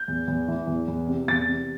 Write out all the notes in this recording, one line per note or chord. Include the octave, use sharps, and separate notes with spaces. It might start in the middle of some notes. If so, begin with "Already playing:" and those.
Already playing: G6
E2
E2
E3
E2
E2
C3
E2 A6
C3